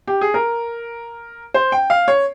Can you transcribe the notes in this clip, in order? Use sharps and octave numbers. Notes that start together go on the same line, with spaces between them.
G4
G#4
A#4
C5
G5
F5
C#5